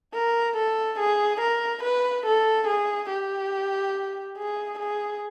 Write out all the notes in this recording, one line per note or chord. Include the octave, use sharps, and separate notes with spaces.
A#4
A4
G#4
A#4
B4
A4
G#4
G4
G#4
G#4